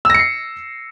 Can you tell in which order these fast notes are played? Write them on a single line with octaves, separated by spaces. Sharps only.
E6 A#6 C#7 C7